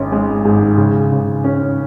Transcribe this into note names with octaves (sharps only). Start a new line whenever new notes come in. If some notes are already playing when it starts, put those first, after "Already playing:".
Already playing: G#1 C#4
G#3
G#2
C#3
C#3
C#4